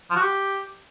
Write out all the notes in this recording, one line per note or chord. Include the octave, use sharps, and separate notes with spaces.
F3
F#4
G4